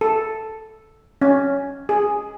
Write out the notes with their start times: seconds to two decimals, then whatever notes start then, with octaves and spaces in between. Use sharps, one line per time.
0.01 A4
1.21 C#4
1.89 G#4